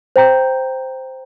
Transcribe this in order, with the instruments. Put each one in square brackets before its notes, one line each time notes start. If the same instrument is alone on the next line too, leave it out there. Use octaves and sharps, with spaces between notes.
[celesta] C5 G5 A#5 G6